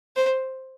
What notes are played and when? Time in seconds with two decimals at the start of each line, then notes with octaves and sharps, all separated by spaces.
0.16 C5